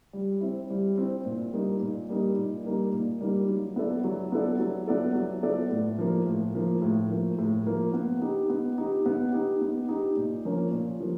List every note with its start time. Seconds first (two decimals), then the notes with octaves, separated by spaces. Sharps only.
0.13 G3
0.41 C4 E4
0.70 G3
0.98 C4 E4
1.25 A#2
1.52 G3 A#3 D#4
1.81 A#2
2.09 G3 A#3 D#4
2.37 A#2
2.64 G3 A#3 D#4
2.92 A#2
3.21 G3 A#3 D#4
3.49 F#3
3.76 B3 E4 A4 D5
4.04 F#3
4.32 B3 E4 A4 D5
4.59 F#3
4.87 B3 E4 A4 D5
5.15 F#3
5.43 B3 E4 A4 D5
5.71 A2
5.98 F3 A#3
6.26 A2
6.55 F3 A#3
6.82 A2
7.10 F3 A#3
7.39 A2
7.66 F3 A#3
7.94 B3
8.21 D#4 G4
8.50 B3
8.78 D#4 G4
9.06 B3
9.32 D#4 G4
9.61 B3
9.89 D#4 G4
10.17 A#2
10.45 F3 A#3 C#4
10.72 A#2
11.00 F3 A#3